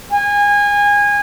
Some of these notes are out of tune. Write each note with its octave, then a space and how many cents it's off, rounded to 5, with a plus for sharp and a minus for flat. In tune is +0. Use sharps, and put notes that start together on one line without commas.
G#5 -25